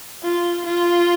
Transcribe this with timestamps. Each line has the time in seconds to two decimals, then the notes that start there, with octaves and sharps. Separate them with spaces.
0.23 F4
0.66 F4